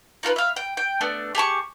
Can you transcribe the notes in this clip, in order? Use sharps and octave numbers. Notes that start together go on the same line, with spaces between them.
D#4 F4 A#4 B4
E5 F5
G5
G5
A3 B3 D4
G4 G#4 A5 C#6